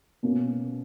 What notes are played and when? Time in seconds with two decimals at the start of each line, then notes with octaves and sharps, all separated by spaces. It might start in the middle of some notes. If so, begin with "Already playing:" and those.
0.23 B2 A#3 C#4